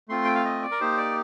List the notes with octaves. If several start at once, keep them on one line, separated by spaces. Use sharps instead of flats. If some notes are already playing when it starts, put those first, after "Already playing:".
A3 C4 F4 C6
G5
F5
D#5
D5
A#4
A#3 D#4 G4 C5
D5